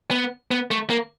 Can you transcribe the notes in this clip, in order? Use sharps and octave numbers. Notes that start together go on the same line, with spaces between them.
B3
B3
A3
A#3